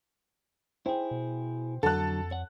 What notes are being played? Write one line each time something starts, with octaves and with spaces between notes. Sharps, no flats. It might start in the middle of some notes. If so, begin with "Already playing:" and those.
E4 G#4 C5 G5
B2
F2 D3 F#3 A4 F#5 A5 F#6
C#5 F#5